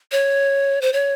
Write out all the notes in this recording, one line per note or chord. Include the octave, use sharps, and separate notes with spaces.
C#5
C5
C#5